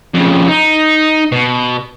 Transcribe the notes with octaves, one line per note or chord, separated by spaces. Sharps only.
F2 C#3
D#4
B2